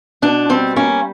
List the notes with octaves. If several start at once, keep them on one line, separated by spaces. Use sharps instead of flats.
B2 D4
G3 C4
A#3 C#4